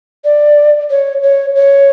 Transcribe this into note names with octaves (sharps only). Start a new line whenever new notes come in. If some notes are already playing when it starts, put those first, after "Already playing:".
D5
C#5
C#5
C#5